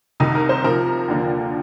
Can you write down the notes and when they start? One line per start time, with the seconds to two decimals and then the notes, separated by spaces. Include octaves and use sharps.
0.20 C2 C3 D#3 D#4
0.35 A#4
0.49 C5
0.64 C2 C3 F3 A#4
1.08 D#2 D3 F3